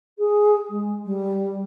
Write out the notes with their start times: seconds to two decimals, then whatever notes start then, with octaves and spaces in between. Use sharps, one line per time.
0.18 G#4
0.69 G#3
1.05 G3